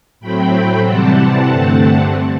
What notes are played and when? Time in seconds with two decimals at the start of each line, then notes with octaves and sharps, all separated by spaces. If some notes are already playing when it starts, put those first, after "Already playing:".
0.20 A2 F#3 A3 C4 G5 B5
0.83 C3 E3 G3 C4 F#5 A5
1.47 G2 D3 A3 C4